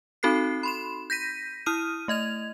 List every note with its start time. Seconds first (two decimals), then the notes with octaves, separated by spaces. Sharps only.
0.23 C4 D#4 F#4 A4 F#6 C7
0.63 B5 C6 E7
1.10 G6 A#6 B6 D#7
1.66 E4 D#6 F6 D#7
2.08 A3 D#5 G#6 F7